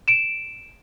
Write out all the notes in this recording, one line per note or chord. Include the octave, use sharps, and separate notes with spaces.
D7 E7